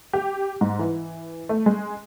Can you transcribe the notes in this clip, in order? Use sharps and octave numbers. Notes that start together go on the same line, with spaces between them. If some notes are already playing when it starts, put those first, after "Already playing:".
G4
G#2
E3
A3
G#3